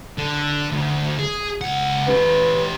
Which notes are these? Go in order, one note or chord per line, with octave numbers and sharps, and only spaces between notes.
D3
D2
G#4
C#2 F#5
C#4 G4 B4